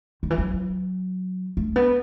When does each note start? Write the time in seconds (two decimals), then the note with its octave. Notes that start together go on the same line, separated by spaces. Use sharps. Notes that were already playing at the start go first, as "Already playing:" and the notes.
0.23 D#3
0.30 E3
0.38 F#3
1.57 A3
1.76 B3